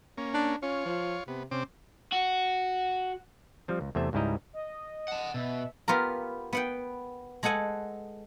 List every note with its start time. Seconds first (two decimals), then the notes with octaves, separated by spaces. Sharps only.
0.17 A#3 C#4
0.34 D4
0.62 C#4 F4 C#5
0.86 F3
1.28 C3 B3
1.51 C3 C4 C#4 D6
2.13 F#4
3.68 F3 G3 C4
3.81 C#2
3.95 E2 C3 A3 C5 E5
4.13 C#2 G#2 G3 E4 D#5 A#5
4.53 D#5
5.08 F#5 A5
5.34 B2 E5
5.88 B3 F4 G4 A#4
6.53 B3 F#5 G5
7.43 G#3 G#4 A4 F#5 G#5